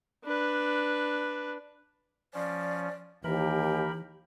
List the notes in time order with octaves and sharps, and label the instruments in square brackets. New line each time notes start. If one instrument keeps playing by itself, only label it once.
[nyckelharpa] D4 B4
[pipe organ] F3 C#4 [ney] D5
[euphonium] D#2 [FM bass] E3 [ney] G4 [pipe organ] A#4 B5